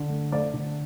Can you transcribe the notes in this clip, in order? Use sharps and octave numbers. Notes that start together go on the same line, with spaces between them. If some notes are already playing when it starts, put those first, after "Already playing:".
Already playing: D3
A3
A3 D5
D3